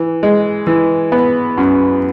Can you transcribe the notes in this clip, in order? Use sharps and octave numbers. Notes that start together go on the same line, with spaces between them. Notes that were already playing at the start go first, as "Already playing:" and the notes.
Already playing: E3
G#3
E3
B3
F#2